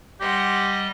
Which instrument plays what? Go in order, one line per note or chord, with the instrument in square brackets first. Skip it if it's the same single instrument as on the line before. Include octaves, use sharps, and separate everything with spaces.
[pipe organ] G3 D#5 [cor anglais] G4 [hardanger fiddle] F#5 C6